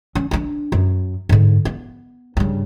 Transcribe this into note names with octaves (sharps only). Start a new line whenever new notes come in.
C#4
C4 D4
F#2
G#2 D3
B3
G2 C#3